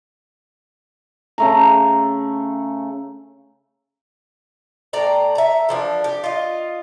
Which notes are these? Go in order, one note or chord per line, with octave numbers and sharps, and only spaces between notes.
C#3 A3 A#5
A2 D5 G5 A#5
E5 A#5
E3 F3 D4
G4
F4 D#5